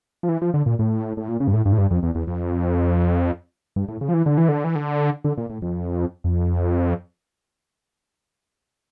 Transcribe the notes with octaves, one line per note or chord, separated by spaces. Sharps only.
F3
E3
F3
D3
A#2
A2
A2
A#2
C#3
G2
A2
G2
A2
G2
F2
E2
E2
F2
G2
A2
C#3
F3
E3
D3
E3
D3
E3
D3
D3
A#2
A2
F2
F2